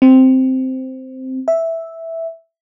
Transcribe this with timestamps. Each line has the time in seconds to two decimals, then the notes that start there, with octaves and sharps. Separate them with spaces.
0.02 C4
1.48 E5